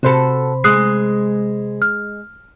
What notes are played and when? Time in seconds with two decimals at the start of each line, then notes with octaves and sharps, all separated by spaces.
0.03 C3 F#4 A4 C5 B5
0.64 G#3 D#6 F#6 C7
1.82 F6